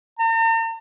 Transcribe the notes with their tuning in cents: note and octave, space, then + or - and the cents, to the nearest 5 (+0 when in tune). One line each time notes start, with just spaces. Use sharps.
A#5 -45